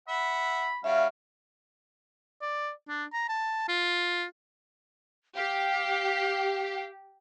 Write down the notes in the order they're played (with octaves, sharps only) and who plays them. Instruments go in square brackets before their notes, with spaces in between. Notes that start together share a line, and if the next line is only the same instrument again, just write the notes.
[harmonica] E5 F#5 [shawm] B5
[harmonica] G3 C#4 F#4 [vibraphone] E5 [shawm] F5
[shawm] D5
D4
A#5
A5
F4
[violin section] G4 [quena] F5